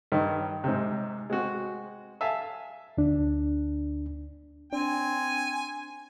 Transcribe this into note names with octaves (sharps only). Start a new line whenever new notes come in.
G2 D#3 D#4
G#2 C3
G#3 C4 F#4
E5 F5 G#5 A5
D2 D4
C4 D4 G#5